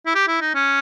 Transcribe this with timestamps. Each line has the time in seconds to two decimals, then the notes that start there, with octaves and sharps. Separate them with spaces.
0.06 E4
0.15 G4
0.28 E4
0.41 D#4
0.54 C#4